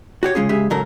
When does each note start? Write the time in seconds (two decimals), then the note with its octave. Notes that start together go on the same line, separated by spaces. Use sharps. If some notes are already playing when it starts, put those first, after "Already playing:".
0.23 F#4 G4 C#5
0.35 C#3 G#3 C#4 F4 G#4
0.49 C#3 G#3 G4 G#4 E5
0.70 G#2 C#3 F#3 A4 A#4